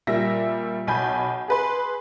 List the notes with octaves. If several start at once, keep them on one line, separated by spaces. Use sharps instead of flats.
A#2 G3 E5 A#6
B1 G#5 B5 G6
G#4 B4 C6